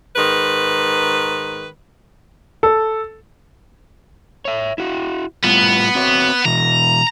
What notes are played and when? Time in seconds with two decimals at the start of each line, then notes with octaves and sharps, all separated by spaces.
0.16 G#2 D#3 B4
2.63 A4
4.45 C#5 E5
4.78 E4 F#4
5.44 A2 G3 B3 F4
5.95 C4 F#4 C#5
6.45 B2 E3 A#5